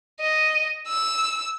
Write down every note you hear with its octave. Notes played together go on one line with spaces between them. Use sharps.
D#5
E6